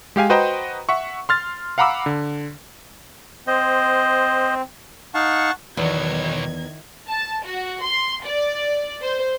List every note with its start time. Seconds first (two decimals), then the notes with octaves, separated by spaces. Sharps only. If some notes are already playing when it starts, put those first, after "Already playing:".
0.16 G#3 G4 F5 G#5
0.30 F#4 B4 C5 D#5 G5 A#5
0.89 E5 F#5 C#6
1.29 C6 F6 A6
1.78 F5 F#5 A#5 B5 D6 E6
2.06 D3
3.47 C4 C5 D#5
5.14 D#4 F5 F#5 A5 C#6
5.77 B1 E2 D#3 F#3 G#6
7.08 A5
7.45 F#4
7.85 C6
8.25 D5
9.02 C5